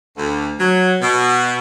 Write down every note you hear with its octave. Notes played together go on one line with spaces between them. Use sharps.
D2
F#3
B2